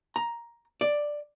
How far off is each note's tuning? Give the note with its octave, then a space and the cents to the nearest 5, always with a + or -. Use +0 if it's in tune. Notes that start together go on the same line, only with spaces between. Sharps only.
A#5 +10
D5 +5